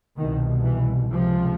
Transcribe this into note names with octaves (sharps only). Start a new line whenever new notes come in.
C2 B2 D#3
E3
C#2 C3 F3